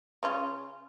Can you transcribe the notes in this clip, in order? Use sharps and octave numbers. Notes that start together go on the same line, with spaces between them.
C#3 C#4 F4